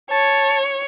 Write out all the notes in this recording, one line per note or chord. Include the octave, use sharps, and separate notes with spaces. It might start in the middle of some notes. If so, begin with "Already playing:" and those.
C#5 A5